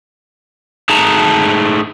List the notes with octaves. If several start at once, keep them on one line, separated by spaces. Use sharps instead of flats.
A3 D#4 G#4 A5 A#5